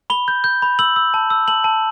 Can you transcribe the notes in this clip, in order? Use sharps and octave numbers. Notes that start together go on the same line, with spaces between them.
B5 G7
G6
G6
B5
E6 F#7
E6
A5
E6
A5 F#7
A5